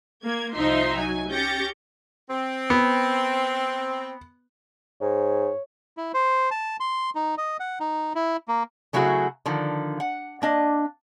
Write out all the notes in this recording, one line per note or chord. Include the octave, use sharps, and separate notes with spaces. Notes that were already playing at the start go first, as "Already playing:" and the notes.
A#3 G#6
C2 F3 D#4 E5 C6
F#3 G#5
C#4 G4 G6 A6 A#6 C#7
C4
B3
G#2 C#5
E4
C5
A5
C6
D#4
D#5
F#5
D#4
E4
A#3
C#3 F#3 A3 E4 F#4 G#4
D3 D#3 F3
F#5
A#3 D4 D#5